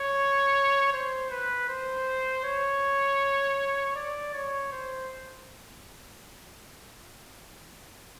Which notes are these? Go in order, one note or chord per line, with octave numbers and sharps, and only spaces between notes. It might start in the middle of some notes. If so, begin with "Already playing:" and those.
Already playing: C#5
C5
B4
C5
C#5
D5
C#5
C5